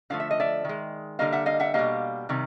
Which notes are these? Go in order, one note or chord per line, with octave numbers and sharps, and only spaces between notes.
D3 F3 A3 F5
E5
D#5
D5 E5
D#3 G#3
D3 G3 A#3 D#5 F5
E5 F#5
D#5 F5
E5 F#5
B2 G3 A#3 D#5 F5
C3 D#3 G3